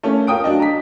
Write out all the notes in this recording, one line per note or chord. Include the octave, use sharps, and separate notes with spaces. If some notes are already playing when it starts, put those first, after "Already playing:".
A3 A#3 C#4
F4 A#4 G5 D#6 D7
F#3 D4 D#5
A#5 B6